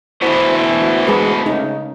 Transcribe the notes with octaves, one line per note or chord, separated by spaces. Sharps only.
D2 B2 E3 E4 C5
G#3 G#4 B4
C#3 D#4